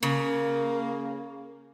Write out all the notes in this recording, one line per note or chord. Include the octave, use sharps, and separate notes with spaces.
C#3 A#3